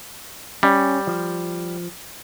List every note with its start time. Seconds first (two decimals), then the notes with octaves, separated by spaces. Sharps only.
0.63 G3 C#4
1.07 F3